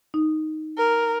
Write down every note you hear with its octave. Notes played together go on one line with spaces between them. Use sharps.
D#4
A#4